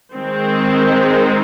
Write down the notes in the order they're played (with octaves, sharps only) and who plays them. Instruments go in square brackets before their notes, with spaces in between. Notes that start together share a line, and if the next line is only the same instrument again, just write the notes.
[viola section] D#3 G#3 C4